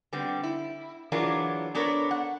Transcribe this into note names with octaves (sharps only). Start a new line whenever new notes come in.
D3 G3 B3 C4
E4
E3 F#3 D4 F4 G#4 A#4
B3 D4 A4 A#4 C#5
F#5